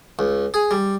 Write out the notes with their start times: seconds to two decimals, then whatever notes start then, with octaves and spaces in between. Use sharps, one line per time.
0.19 C#2
0.54 G#4
0.71 G3